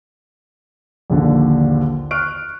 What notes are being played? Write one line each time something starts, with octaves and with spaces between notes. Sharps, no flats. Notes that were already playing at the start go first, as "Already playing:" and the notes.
A#1 D#2 D3
C#6 F6 F#6 D7